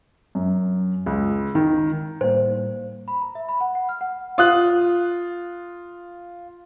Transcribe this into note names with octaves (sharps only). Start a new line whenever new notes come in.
F#2
C#2
D#3
A2 G3 A#3 C5
B5
A#5
E5
B5
F#5
F#5
F6
F#5
F4 D#6 F#6